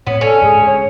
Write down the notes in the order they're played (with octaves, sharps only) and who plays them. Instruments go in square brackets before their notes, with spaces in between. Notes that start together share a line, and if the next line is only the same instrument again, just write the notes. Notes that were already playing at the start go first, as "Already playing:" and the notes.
[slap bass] A2 C4 [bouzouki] B3 [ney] C#5
[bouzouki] C#4 [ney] A4
[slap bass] D2 G#2 [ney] G#4
[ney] C#5